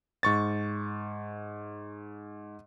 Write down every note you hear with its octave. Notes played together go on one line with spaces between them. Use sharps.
G#2 C#6 A6